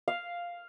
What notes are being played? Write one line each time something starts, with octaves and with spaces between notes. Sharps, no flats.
F5